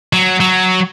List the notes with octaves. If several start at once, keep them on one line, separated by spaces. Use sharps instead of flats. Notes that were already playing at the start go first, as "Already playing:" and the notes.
F#3
F#3